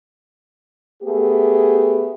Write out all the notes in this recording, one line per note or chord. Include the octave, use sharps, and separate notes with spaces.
A3 B3 G4 G#4